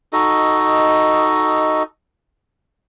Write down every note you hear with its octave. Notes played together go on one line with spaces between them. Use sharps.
D#4 F#4 A4 D#5